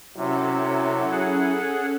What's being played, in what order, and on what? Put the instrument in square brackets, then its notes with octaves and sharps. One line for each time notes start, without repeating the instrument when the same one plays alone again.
[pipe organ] C3 [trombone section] F#3 E4 [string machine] C#4 A4
[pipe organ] G#4 F#5